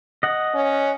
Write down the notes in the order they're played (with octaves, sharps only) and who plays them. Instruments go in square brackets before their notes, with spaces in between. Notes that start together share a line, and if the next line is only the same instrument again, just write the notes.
[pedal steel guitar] D#5 F#5
[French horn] C#4